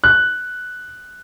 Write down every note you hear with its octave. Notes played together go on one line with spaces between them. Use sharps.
F#6